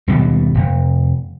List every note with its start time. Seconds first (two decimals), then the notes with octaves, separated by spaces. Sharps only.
0.08 D#2 B2 F#3 G3
0.55 F1